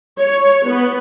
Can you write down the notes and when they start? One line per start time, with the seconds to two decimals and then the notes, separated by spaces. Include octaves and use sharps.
0.20 C#5
0.68 B3